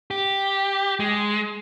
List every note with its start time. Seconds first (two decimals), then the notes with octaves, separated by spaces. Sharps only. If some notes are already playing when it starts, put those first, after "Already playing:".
0.11 G4
1.00 G#3